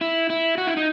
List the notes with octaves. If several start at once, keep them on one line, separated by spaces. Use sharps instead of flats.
E4
E4
F#4
E4
D#4